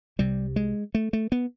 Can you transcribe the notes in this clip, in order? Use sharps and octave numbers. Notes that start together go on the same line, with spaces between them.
C2 C3 G3
G#3
A3
A3
B3